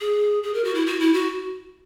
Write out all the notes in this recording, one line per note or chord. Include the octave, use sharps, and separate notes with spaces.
G#4
G#4
A#4
F#4
E4
F#4
E4
F#4